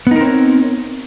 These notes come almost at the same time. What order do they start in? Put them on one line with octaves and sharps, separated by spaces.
B3 D#4 A#4 C4 C#5